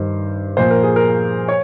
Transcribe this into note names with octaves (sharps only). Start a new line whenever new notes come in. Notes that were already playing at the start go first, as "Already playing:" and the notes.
Already playing: G2 D#3 C5
A#2 F3 C5
A#4
G#4
A#4
C#5